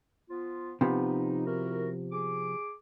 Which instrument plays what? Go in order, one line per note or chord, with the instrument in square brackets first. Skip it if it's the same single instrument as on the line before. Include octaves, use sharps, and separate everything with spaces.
[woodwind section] F3 B3 F4
[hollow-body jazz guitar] C3 F3 B3 [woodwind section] D#4
[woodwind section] E4 F#4 A#4
G#4 D6